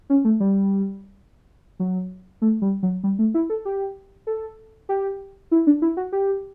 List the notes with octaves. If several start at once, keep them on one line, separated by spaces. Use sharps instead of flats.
C#4
A3
G3
F#3
A3
G3
F#3
G3
A3
E4
A4
G4
A4
G4
E4
D4
E4
F#4
G4